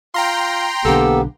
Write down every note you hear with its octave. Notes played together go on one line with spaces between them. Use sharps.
F4 G5 A#5 C6
B1 D3 A#3 B3 G4 A4